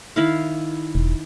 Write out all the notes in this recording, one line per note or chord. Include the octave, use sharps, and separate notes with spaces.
D#3 E4 F5
E1